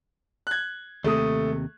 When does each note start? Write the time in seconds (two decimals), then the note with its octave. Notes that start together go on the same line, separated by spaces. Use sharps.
0.47 F#6 G#6
1.04 D#2 C3 A3 D#6